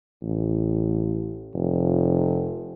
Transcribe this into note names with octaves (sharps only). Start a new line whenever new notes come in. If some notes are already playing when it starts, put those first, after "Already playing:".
A1
F1